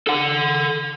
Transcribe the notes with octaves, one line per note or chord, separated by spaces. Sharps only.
A4 F#5